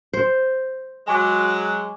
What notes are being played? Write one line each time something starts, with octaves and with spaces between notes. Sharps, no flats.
C5
F#3 G#3 G#5 C#6 D6